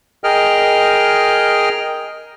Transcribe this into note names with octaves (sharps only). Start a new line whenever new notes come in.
G#4 A#4 D#5 G5 F6